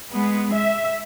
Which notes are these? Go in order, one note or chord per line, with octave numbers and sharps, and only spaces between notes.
G#3 B3
E5